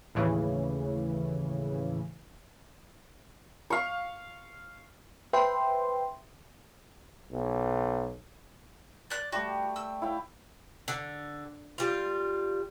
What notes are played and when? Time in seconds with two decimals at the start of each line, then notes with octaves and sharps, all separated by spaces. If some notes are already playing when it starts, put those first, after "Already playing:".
0.15 D#2 A2 C#3 E3
3.70 F5 C#6
5.33 B4 C5 E5 G5 C6
7.32 B1
9.10 D5 F#6
9.32 G3 A3 F#4 G4
9.76 E6
10.02 E4 F5 G5
10.88 D3
11.78 G3 F4